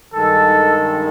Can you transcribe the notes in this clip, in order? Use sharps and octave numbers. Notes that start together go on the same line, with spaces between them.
G2 D#3 G#3 A4